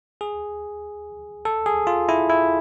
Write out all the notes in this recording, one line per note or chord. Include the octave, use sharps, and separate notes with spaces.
G#4
A4
G#4
F4
E4
E4